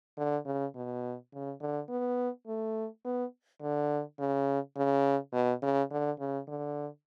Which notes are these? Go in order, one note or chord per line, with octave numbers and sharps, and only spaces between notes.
D3
C#3
B2
C#3
D3
B3
A3
B3
D3
C#3
C#3
B2
C#3
D3
C#3
D3